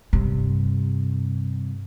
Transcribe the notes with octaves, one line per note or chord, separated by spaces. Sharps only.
G2 C3